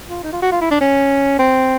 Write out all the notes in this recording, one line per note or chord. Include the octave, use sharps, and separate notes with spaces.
F4
D#4
F4
F#4
F4
E4
D4
C#4
C4